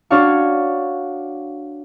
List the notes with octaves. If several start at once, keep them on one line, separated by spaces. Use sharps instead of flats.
D4 F#4 C#5 D5 F5 C#6